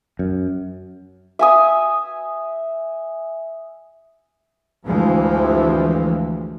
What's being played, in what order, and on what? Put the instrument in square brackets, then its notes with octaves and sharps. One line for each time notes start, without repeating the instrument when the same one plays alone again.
[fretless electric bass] F#2
[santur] E5 G#5 D#6
[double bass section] D2 G2 E3 F3 G#3 A3